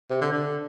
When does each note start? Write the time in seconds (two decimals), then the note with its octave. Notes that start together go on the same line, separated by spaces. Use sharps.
0.10 C3
0.21 D3
0.32 D3